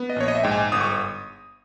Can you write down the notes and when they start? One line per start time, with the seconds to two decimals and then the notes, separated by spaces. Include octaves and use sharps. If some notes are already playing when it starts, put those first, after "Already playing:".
Already playing: B3
0.10 D#5
0.16 A#1 C#5
0.28 D#5
0.35 E5
0.43 G#2 G5
0.51 G#5
0.72 G1 D#6
0.81 C#6